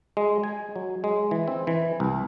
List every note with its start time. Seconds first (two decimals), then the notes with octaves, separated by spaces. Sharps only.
0.17 G#3
0.43 G#5
0.76 F#3
1.04 G#3
1.31 E3
1.48 C4
1.67 E3
2.00 C2